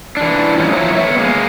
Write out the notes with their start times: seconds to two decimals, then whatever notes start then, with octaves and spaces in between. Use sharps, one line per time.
0.17 E3 D4
0.58 A2 E3 G3 B3 C#4 D#4
0.71 F3 E4 C#5 A#5
0.93 B3 C#5 E5
1.18 G#3 A#3